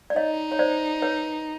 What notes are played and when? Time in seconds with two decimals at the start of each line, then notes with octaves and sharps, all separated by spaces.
0.10 D5
0.16 D#4 C#5 D#5
0.52 C#5
0.59 C5 D5
1.02 B4 C#5